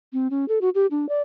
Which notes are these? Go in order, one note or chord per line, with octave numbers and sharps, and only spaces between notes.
C4
C#4
A4
F#4
G4
D4
D5